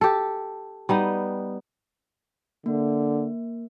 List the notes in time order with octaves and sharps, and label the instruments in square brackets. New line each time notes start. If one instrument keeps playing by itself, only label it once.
[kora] G4 A4
G3 B3 D#4
[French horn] D3 [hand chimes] A#3